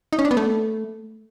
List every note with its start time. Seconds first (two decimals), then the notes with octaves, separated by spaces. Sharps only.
0.13 D#4
0.19 C#4
0.25 D4
0.31 B3
0.37 A3